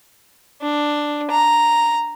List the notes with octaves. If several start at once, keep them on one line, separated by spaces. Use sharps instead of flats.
D4
A#5